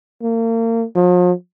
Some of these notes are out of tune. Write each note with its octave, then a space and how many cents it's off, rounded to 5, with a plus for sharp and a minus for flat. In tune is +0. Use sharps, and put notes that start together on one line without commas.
A#3 -35
F3 +40